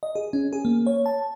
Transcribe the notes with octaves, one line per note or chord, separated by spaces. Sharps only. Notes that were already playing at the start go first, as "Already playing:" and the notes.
D#5
G#4
C#4
G#4
A#3
C#5
A5